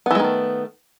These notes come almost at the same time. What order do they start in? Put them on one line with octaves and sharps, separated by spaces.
B3 E3 G#3 D#3 A3